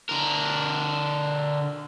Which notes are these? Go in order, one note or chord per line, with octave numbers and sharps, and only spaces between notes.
D3 A#4